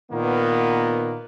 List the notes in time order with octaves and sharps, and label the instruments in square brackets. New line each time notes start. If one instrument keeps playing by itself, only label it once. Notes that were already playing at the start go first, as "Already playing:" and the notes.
[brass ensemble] A#2 D#3 A#3 B3